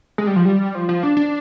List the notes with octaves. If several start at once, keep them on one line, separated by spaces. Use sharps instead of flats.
G#3
G3
F3
G3
F3
F3
D4
D4